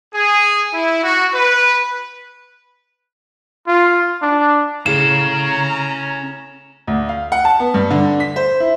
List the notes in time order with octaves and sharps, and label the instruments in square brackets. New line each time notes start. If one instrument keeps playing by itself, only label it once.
[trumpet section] G#4
E4
F#4
B4
[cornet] F4
D4
[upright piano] A2 C#3 [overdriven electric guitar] C#4 F5 [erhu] A#5 [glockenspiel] E7
[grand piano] D2
F5
F#5
A5
B3
G2
D3
B6
C5
E4